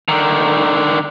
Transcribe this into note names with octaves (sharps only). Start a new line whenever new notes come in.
D3 D#3